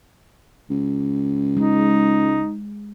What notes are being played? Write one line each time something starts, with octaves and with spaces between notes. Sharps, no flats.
C#2
G#3 D#4